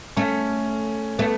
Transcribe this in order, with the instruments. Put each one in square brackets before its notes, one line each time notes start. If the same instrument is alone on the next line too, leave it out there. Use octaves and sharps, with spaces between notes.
[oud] A3 [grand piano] C#4
[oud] A3 [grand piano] B3